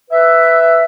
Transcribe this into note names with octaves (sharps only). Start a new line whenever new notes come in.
B4 E5